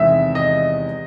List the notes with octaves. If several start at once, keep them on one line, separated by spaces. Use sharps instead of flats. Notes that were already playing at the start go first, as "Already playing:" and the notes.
Already playing: E2 C3 D#3 G#3 E5
D#5